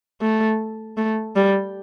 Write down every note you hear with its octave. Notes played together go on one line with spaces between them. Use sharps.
A3
A3
G3